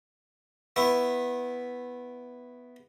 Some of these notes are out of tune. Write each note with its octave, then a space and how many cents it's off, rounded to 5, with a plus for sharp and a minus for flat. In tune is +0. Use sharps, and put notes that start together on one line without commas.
B3 +0 E4 +0 C#6 -40